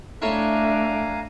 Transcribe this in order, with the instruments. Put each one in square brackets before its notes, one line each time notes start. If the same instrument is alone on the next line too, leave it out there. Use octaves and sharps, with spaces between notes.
[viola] A3 D4 [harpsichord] E4 A4 C#5 [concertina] F5 G#5 A#5